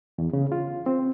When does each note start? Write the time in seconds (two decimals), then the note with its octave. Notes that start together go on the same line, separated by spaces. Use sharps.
0.18 E2
0.33 C#3
0.52 F4
0.86 C4